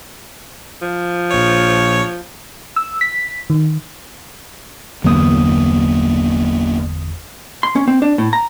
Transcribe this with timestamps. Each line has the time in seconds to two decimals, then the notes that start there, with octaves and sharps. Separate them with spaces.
0.82 F3
1.31 A#1 C#5
2.76 E6
3.01 B6
3.50 D#3
5.04 G1 E2 F#3 A#3 B3 D#6
7.63 C6
7.76 C#4
7.88 C4
8.02 D4
8.18 A2
8.33 A#5